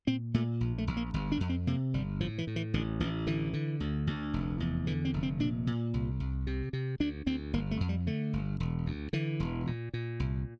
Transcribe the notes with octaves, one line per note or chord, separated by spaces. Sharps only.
A#2 C4
A#2 A3
A#1
A3
A#1
A#3
G1
D4
F2
C4
C3 A#3
G1 G3
A2 F3
E3
A2
E3
A1 D3
A1 E3
D3 E3
D3
D2
D2
F1
E2
D3 E3
C4
F1
C4
A#2 D4
A#2
C2
C2
C3
C3
D2 D4
D2 C4
G1 A#3
A3
F2
G3
D3 A3
G1
E1
D2
D3 E3
E1
A#2
A#2
C2